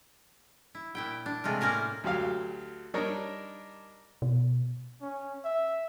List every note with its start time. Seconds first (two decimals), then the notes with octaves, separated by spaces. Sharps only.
0.75 E4
0.95 A#2 E4 G5
1.26 D4
1.44 C3 G#3 A3 F4
1.61 A2 A#3 C#4 A#4 F5
2.04 D2 F#3 G4 F5
2.94 G3 D4 D#4 A#4 C#5
4.22 B2
5.02 C#4
5.45 E5